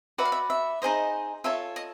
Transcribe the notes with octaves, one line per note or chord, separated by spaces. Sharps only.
F#4 B4 D5 E5
F5
E5
E5
D#4 G#4 C5 D#5
F4 A4 C#5 E5
D#5